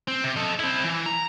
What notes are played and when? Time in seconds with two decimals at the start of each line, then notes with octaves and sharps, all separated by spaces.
0.08 C4
0.24 C3
0.36 A4 D#5
0.59 C4 E4
0.84 E3
1.06 A#5